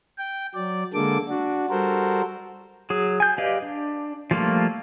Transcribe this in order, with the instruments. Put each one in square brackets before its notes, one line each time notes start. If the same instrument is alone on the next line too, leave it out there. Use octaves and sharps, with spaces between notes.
[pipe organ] G5
F#3 D5
D3 G#3 A#3 A4 D6
D4 F#4
G3 F#4 A4 A#4 C5
[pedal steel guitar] F#3 G#4
G#5 G6
G4 B4 D5 D#5 F5
D4
F3 G3 A3 A#3 F4